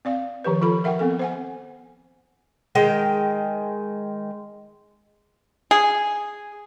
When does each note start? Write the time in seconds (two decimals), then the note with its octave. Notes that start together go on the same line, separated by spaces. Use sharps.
0.05 C4 D5 F5
0.44 D#3 F3 G4 B4
0.61 F3 F4 A4 B5
0.84 A#4 E5 F#5 G5
0.99 B3 C4 A4
1.19 C5 F#5 G#5
2.75 D#3 G#3 G5
5.71 G#4